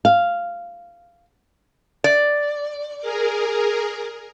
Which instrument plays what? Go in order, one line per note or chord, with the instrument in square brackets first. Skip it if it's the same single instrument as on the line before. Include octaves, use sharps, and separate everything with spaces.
[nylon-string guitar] F5
[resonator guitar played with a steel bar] D5
[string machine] G#4 A#4